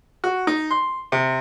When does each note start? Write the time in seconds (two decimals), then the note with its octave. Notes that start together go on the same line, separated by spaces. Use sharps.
0.24 F#4
0.47 D#4
0.71 C6
1.12 C3